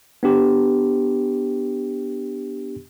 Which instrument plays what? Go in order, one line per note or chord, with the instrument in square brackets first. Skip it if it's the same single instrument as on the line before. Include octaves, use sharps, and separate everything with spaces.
[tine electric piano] B3 D4 G4